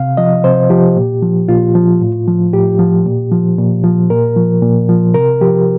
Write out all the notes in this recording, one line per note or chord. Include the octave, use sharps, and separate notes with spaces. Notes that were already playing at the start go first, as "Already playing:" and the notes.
Already playing: C3 F5
F3 D#5
C3 C5
F3 G4
A#2
F3
A#2 F4
F3
A2
F3
A2 G4
F3
A#2
F3
A#2
F3
A#2 A#4
F3
A#2
F3
C3 A#4
F3 G4